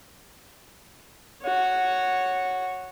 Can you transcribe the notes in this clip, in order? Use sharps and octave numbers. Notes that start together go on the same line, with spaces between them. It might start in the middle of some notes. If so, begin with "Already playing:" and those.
F#4 C#5